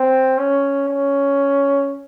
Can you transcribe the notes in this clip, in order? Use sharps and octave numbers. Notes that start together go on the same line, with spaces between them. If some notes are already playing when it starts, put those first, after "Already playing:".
Already playing: C4
C#4
C#4